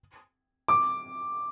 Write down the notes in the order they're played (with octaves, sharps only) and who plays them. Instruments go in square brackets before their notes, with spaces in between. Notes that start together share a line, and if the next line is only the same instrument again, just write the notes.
[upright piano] D6